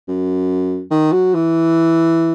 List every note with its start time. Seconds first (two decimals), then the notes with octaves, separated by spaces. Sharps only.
0.08 F#2
0.91 D#3
1.12 F#3
1.34 E3